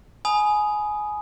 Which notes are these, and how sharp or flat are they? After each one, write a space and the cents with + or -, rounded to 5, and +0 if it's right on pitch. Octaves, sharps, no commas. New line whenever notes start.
G#5 +20 B5 -10 D#6 +0